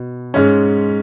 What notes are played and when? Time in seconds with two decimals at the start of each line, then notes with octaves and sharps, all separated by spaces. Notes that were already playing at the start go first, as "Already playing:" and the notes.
Already playing: B2
0.34 G#2 G#3 C#4